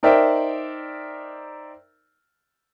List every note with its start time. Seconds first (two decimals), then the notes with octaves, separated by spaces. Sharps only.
0.03 D#4 A#4 C5 D5 E5 G5